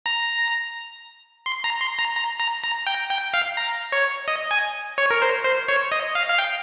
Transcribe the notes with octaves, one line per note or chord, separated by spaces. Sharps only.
A#5
C6
A#5
C6
A#5
A#5
A#5
A#5
G5
G5
F5
A#5
C#5
D#5
G#5
C#5
A#4
C5
C5
C#5
D#5
F5
F5
G5